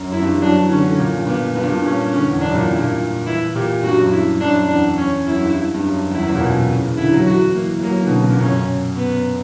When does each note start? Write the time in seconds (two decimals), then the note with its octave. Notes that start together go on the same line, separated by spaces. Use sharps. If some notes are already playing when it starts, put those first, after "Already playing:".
Already playing: F#2
0.12 F#2 E4
0.22 G2
0.32 E3
0.41 F#3 D4
0.56 E3
0.69 D3 C#4
0.83 D3
0.99 A#2
1.17 G2
1.27 A#2 B3
1.55 G2 B3
1.63 A#2
1.72 G2
1.84 C#4
2.12 D3 C#4
2.27 E2
2.41 F#2 D4
2.55 A#2
2.68 G2 E4
2.80 A#2
3.26 E3 E4
3.55 A#2 G4
3.83 G2 F#4
3.92 F#2
4.02 G2
4.11 E4
4.40 F#2 D4
4.68 E2 D4
4.97 C#4
5.26 F#2 E4
5.40 G2
5.74 G2
5.83 F#2
6.11 E2 E4
6.22 F#2
6.26 E2
6.35 A#2
6.40 B2
6.69 C#3
6.83 E3
6.97 D3 E4
7.12 F#3
7.26 E3 F#4
7.39 E3
7.54 E3 A#3
7.76 E3
7.82 F#3 A#3
7.93 E3
8.02 B2 D3
8.11 C#3
8.21 C#3
8.30 A#2
8.40 F#2 C#4
8.97 B3